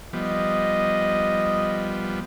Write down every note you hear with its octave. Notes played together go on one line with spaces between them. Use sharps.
F3 G3 B3 D#5